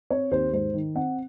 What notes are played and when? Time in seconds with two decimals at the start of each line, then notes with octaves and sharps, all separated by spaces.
0.10 C4 C#5
0.31 D#2 C5
0.53 G#2 C5
0.74 D#3
0.95 C4 F#5